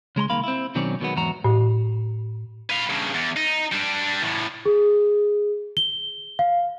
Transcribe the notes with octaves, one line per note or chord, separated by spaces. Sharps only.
C#3 G#3 A#5 C6
C2 D#3 A#3 F5 B5
C4 E4
B2 D#3 F#3 C4 C#4 D5
B2 D#3 F#3 G#3 B3
E2 G#2 F#3 F#4 A#5
A2
B4 F5
G2 C#3
E2
D#4
G3 D4
E2 A2
G#4
G7
F5